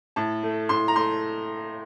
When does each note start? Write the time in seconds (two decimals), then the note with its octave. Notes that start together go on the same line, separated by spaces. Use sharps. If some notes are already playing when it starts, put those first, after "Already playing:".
0.16 A2 A5
0.43 A3
0.69 A2 C6
0.88 A#5
0.96 A3 C6